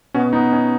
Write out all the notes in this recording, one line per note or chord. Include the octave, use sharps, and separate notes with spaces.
B2 B3 C#4 F#4
B3 D#4
C#4